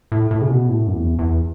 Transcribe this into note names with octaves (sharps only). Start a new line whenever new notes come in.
A2
A2
C#3
B2
A2
F#2
E2
E2